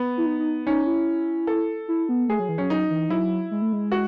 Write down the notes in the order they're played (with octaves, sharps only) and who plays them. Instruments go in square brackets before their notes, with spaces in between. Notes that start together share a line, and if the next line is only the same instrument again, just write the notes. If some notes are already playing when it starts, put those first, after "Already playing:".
Already playing: [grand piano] B3
[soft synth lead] E4
D#4
D#4
[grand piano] C#4 [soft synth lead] D#4
[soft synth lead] E4
[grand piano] A4
[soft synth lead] E4
B3
[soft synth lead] A3 [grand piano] G#4
[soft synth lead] F#3
E3
[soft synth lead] F#3 [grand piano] C#4
[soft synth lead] F#3 [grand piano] D#4
[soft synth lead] E3
[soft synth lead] F#3 [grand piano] E4
[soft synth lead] G#3
A3
G#3
[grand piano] F#4